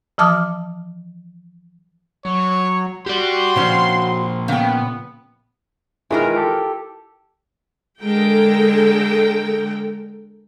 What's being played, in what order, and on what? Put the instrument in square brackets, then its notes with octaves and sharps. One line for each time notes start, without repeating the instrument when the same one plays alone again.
[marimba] E3 F3 A5 D6 D#6 F6
[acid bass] F#3 [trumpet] C#5
[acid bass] F#4 [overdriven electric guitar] G4 D5 [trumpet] C6
[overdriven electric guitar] A#2 F3 [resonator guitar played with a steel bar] C#3 C4 C#4
[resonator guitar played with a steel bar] C#3 G5 [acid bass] B3
[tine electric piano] D#3 E3 G#3 [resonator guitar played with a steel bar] E4 F4 A#4
[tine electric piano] G4 A4
[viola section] D3 G#3 A4 A#4 G5